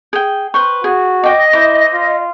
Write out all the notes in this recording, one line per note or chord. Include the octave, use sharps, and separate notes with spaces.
G#4 G5
B4 C5 C#6
F#4 G#4
D#5 G5 D6
E4 C5 D6
F4